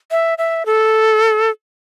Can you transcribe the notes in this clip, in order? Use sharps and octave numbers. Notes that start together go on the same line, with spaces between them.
E5
E5
A4